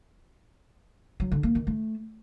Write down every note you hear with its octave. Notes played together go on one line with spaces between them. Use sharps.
F#3
D3
A#3
D#3
A3